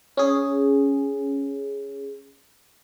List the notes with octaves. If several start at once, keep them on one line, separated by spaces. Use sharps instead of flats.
C#4 G#4